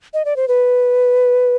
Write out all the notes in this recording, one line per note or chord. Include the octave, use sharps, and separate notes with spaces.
D#5
D5
C5
B4